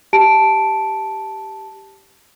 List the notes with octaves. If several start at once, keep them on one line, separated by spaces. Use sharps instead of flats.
G4 A5 D7